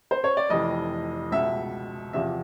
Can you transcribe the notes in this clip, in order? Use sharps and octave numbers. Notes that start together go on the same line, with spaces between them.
C5
C#5
D5
F1 F2 C3 E3 D#5
C#2 B2 E5
E2 C3 F3 E5